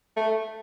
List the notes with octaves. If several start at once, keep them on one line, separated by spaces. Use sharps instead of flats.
A3